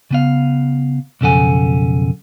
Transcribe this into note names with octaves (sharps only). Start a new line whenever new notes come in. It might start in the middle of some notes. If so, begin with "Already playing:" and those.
C#3 B3 F5
B1 F2 C#3 A4 F#5 G#5